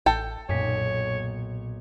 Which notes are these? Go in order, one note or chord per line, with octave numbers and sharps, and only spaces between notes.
A1 A4 G5
B1 F#2 A#2 C#5 B6